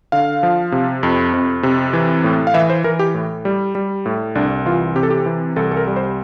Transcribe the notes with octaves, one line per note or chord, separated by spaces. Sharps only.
D3 F5
F3
C3
F2
F2
C3
E3
A2
F5
E3 E5
C5
E3 A#4
G4
A2
G3
G3
A2
C2 D4
E3 F4
C3 G4
A4
G4
E3
C2 A4
A4
A#4
G3
C5